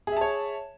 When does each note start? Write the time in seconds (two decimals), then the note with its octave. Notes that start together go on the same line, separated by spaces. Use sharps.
0.07 G#4
0.12 E5
0.17 A5
0.21 C#5